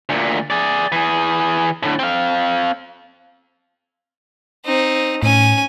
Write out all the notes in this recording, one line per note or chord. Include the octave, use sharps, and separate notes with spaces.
D2 A#2
G#4 D5
E3 G#4
A2 D3
C4 F5
C4 D#4
A2 C#4 G#5